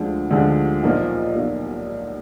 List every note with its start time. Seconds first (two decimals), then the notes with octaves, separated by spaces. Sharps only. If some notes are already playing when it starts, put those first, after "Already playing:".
Already playing: D2 D3 F3 G#3
0.31 D2 D3 F3 G#3
0.83 B1 A#2 F3 A#3
1.35 B1 A#2 F3 A#3